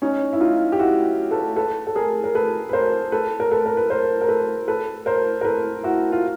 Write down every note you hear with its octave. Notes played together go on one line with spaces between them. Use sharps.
C#4 D#4
E4
D#4 F4
G4
E4 F#4
A4 B4
A4 B4
A4
G#4 A#4
A#4
A4 B4
B4
A#4 C5
A4 B4
A#4
A4 B4
A#4
B4
A#4 C5
A#4
A4 B4
A4 B4
A#4 C5
A#4
A4 B4
E4 F#4
F4